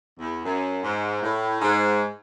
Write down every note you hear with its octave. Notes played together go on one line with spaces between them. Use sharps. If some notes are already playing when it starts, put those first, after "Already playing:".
E2
F#2
G#2
A2
G#2